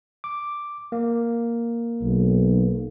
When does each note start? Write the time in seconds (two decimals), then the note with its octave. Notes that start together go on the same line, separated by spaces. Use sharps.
0.24 D6
0.92 A#3
2.02 B1